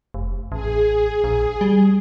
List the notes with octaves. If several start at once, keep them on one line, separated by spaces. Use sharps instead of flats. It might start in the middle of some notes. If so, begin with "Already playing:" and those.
F1
A1 G#4
A#1
G3